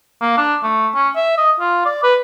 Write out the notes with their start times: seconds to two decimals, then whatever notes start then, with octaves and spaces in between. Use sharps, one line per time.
0.21 A#3
0.38 D4
0.63 A3
0.95 C#4
1.16 E5
1.38 D#5
1.60 F4
1.86 D5
2.03 B4